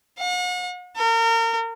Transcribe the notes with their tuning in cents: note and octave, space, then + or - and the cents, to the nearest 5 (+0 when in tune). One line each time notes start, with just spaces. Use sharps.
F#5 -40
A#4 -35